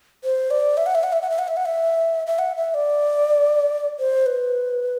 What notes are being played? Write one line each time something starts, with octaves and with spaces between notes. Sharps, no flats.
C5
D5
E5
F#5
E5
F#5
E5
F#5
E5
F#5
E5
F#5
E5
E5
F#5
E5
D5
C5
B4